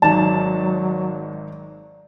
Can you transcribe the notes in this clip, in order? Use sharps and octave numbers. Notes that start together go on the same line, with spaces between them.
G#1 D#3 F#3 D#4 D5 A5 A#5